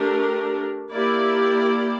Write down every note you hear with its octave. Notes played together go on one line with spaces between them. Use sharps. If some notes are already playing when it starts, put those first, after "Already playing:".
Already playing: A3 D4 G4 A#4
A#3 E4 G4 D5